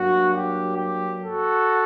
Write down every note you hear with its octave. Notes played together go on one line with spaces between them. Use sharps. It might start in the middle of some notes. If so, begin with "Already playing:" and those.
Already playing: G2 F#3 A#3 D4 F#4
G4
G4
F#4 A4